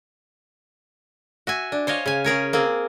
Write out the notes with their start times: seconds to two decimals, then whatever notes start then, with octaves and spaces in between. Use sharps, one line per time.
1.47 F#4 E5 G#5
1.72 D4
1.87 C5 C#5 D#5 F5
2.06 C#3 G#5
2.24 C#4 G#4 A#4 C#5
2.53 A#3 C4 G#4